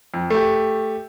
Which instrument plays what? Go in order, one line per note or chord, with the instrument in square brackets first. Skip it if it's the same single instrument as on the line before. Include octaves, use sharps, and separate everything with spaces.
[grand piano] F2
A3 G4